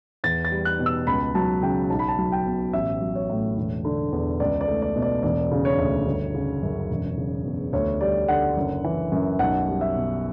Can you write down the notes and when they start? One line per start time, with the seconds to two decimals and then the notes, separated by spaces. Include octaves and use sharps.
0.24 E2 A6
0.45 A6
0.51 G3
0.65 F#6
0.79 B2
0.86 E6
1.07 C#2 B5
1.35 F#3 A5
1.63 C#3 G5
1.90 B1 A5
1.99 B5
2.08 A5
2.18 F#3
2.32 G5
2.46 B2
2.73 A1 E5
3.01 F#3
3.15 C#5
3.30 A2
3.57 E1
3.85 D3
4.12 E2
4.40 C#2 D5
4.61 D5
4.68 A3
4.82 D5
4.96 B2
5.02 D5
5.23 E1 D5
5.51 C#3
5.65 C#5
5.78 D2
6.07 G1
6.34 C#3
6.62 F#2
6.90 E1
7.18 C#3
7.45 E2
7.73 D2 C#5
8.01 G3 D5
8.28 D3 F#5
8.57 F#1
8.84 E3
9.12 F#2
9.39 B1 F#5
9.68 G3
9.81 E5
9.95 B2